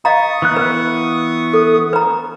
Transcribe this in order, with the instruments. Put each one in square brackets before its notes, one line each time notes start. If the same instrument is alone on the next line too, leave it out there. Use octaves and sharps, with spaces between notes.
[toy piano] D#5 F5 A#5 [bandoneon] C#6 D#6
[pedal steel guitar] E3 B3 F#6
[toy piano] B4
A4
B4 A#5